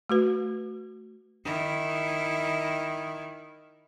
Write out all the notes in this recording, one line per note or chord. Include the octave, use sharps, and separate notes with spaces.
A3 F#4 B4
D#3 E4